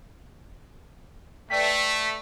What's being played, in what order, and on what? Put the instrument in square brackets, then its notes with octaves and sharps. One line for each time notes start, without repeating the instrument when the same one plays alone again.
[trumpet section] A3 [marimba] B4 D5 G5 [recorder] B6